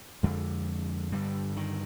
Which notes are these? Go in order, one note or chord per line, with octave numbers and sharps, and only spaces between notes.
F2 D3 G#3
G2 D3 G3
D#3